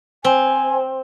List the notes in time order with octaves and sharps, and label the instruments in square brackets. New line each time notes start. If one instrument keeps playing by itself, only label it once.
[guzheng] C4 [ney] G#5